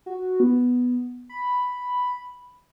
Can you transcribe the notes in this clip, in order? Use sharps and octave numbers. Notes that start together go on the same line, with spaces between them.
F#4
B3
B5